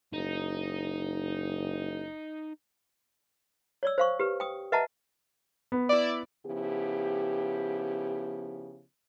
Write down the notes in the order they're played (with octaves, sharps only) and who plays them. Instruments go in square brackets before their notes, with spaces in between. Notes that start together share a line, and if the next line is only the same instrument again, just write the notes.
[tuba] F#1 [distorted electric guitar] D#4
[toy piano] C#5 D5 E6
C5 F5 C#6
G4 B4
G5 D#6
B4 D#5 E5 F#5 A5 A#5
[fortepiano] B3
[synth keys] E4 D5
[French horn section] C#3 F3 B3 E4 G4